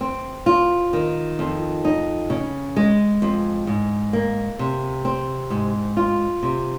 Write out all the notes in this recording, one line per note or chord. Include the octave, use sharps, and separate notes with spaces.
C4
F4
D#3
F2
D#4
C#3
G#3
F2
G#2
A#3
C3
C4
G#2
F4
C3